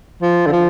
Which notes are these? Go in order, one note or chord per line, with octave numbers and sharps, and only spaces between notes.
F3
D3
F3